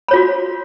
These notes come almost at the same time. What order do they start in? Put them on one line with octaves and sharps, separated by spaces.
B5 C#5 F4 F#4